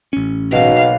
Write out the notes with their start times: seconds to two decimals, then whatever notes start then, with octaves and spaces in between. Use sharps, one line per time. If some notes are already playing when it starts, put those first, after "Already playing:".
0.13 A1 C#4
0.52 B1 B2 A#3 F#4 F5